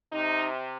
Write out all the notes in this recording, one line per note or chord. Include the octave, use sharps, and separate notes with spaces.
C3 D#4